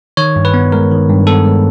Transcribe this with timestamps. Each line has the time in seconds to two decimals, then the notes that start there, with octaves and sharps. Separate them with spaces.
0.17 D#3 C#5
0.36 G2
0.45 B4
0.54 B3
0.72 G#3 A#4
0.91 D#3
1.10 G2
1.27 B3 A4
1.45 G#3